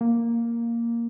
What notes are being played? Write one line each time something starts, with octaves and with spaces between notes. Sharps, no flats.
A#3